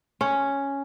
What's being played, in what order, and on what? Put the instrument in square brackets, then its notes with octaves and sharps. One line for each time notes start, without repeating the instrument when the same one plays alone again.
[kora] C#4